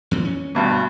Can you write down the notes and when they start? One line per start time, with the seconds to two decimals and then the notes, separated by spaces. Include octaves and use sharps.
0.11 E2 A#2 E3
0.25 C#4
0.55 D2 G2 B2